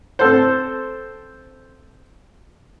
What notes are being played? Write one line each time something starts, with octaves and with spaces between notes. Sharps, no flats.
C4 A4 C5